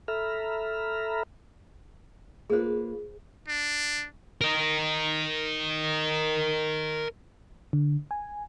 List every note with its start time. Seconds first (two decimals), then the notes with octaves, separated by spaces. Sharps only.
0.08 A4 E5 A#5 B5 F6
2.50 A#3 F4 G#4 B4 C5
3.48 D4
4.41 A#4 D#5
7.73 D3
8.11 G#5